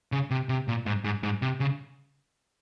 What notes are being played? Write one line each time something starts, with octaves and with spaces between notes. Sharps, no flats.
C#3
C3
C3
A#2
G#2
G#2
G#2
C3
C#3